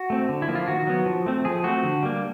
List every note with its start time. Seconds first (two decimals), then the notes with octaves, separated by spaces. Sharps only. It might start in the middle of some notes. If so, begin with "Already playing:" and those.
Already playing: F#4
0.10 A3 C4
0.29 D3
0.42 E4
0.48 F3 A#3
0.55 F4
0.68 D#3 F#4
0.87 F#3 B3
1.06 F3
1.26 A3 C4
1.45 F3 G#4
1.64 A3 C4 F#4
1.84 D3
2.03 G3 A#3